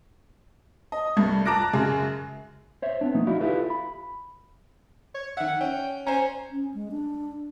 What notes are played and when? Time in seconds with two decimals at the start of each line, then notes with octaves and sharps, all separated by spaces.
0.92 D#5
1.17 C2 G2 A3
1.45 A5 A#5 D6 F#6 A#6 D7
1.73 F#2 C#3 G#3
2.82 C5 C#5 E5
3.01 B3 C4 D4
3.14 B1 F3 A3 A#3 D#4
3.27 D#4 E4 F#4 D5 D#5 F5
3.40 E4 F4 G4 A4 B4 F5
3.70 B5
5.15 C#5
5.37 D#3 E5 F#5
5.61 C#4 G5
6.07 C#4 C5 A#5
6.51 C#4
6.74 G#3
6.91 D4